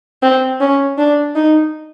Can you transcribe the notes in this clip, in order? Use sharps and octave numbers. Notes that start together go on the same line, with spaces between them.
C4
C#4
D4
D#4